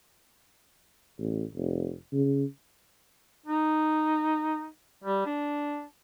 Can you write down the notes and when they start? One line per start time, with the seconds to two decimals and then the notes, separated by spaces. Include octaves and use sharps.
1.19 A1
1.55 F1
2.13 C#3
3.46 D#4
5.04 G3
5.26 D4